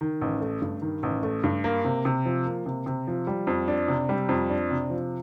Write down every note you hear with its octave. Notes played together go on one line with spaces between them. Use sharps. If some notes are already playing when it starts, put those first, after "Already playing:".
D#3
A1
A3
G2
D#3
A1
A3
G2
A#3
C3
C3
F3
A#3
C3
C3
F3
G3
F2
D4
C3
G3
F2
D4
C3
F3